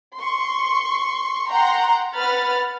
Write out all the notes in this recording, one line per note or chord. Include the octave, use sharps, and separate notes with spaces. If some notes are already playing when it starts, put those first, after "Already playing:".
C6 C#6
F#5 G5 A#5 C6
B4 F#5 B5 F6 A6